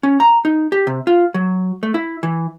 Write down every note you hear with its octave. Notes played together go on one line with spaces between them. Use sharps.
C#4
A#5
D#4
G4
C3
F4
F#3
A3
E4
E3